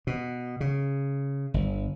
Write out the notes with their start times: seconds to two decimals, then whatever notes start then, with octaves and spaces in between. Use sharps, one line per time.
0.07 B2
0.61 C#3
1.54 G1